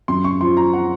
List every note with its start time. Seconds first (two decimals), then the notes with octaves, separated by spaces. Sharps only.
0.08 F#2 C6
0.24 C#6
0.41 F3 C6
0.57 A#5
0.73 F#5